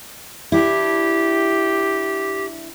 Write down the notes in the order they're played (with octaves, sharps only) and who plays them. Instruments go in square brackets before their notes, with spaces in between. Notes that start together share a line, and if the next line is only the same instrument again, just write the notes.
[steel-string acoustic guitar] D4 E4 [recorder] G4